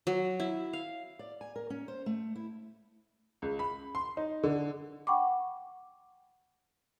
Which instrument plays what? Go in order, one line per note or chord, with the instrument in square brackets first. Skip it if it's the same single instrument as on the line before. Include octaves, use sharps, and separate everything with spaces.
[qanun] F#3
E4
F5
[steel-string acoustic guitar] D5
G#5
A#4
C#4
C5
A3
E4
[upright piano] C#2
B5
C6
D#4
D3
[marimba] F#5 G5 B5 C#6 D6